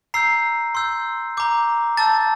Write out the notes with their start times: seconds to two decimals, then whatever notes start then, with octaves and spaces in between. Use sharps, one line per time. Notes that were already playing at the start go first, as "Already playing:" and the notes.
0.14 A#5 E6 G6 C7
0.75 C6 E6 G6
1.37 A#5 D6 G6
1.97 A5 E6 G6 A6